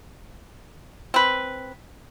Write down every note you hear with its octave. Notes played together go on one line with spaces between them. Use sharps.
C4 B4